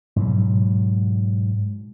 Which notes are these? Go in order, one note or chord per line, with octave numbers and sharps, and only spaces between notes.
G#2 B2 F#3